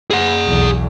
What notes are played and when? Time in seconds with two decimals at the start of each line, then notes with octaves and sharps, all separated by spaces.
0.10 G#4 F#5
0.46 B1 E2